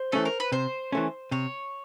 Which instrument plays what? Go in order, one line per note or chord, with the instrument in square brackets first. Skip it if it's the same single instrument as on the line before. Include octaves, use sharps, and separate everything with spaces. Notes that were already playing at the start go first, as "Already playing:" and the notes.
Already playing: [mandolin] C5
[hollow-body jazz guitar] E3 A3 C#4 [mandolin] A4
[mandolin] A#4
B4
[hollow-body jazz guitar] C3 [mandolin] C5
[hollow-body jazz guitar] E3 A3 C#4
[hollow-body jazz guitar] C3 [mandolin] C#5